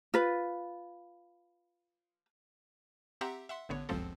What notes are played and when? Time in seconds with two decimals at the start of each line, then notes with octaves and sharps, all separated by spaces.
0.14 F4 B4
3.21 C4 G4 E5 F#5 A#5 C6
3.49 E5 F#5 C6
3.69 A1 D3 B3 C#5
3.89 G1 C#2 F#2 F3 C4 A4